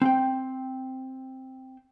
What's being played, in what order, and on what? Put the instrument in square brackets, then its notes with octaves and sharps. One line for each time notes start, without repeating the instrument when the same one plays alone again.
[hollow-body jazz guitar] C4 G5